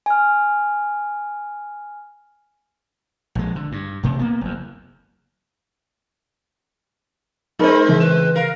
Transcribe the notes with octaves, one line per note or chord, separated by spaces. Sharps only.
G#5 F6
A#1 G#3
D3
G2
E1 C3 A3
A#3 B3
F#1 E2
G#3 C4 D#4 A#4 C5 B5
C#3 E3 C#4 E5
B4 E7
A#4 F5